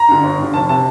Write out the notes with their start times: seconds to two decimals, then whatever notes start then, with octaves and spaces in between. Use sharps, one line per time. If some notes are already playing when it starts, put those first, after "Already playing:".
Already playing: A#5
0.08 G2 D3
0.23 G1
0.38 G2 D3
0.54 F1 A5
0.69 C3 A5